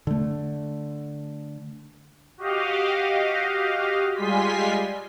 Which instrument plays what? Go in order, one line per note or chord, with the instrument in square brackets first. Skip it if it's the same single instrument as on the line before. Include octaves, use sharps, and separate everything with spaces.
[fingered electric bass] D3 A3
[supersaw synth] F#4 G4 D#5 F5
G3 G#3 F4 G#5 C6 B6